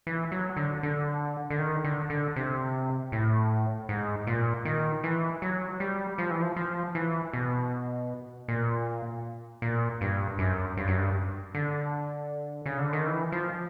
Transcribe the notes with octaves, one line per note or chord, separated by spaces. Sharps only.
E3
F#3
D3
D3
D3
D#3
D3
D3
C3
A2
G#2
A#2
D#3
E3
F#3
G3
F3
E3
F3
F3
E3
B2
A#2
A#2
G2
F#2
G2
F#2
G2
D3
C#3
D3
D#3
E3
F3